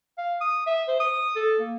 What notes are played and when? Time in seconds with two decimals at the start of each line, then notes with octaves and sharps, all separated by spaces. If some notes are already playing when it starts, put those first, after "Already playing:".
0.18 F5
0.41 D#6
0.66 E5
0.88 C5
1.00 D#6
1.36 A4
1.60 A#3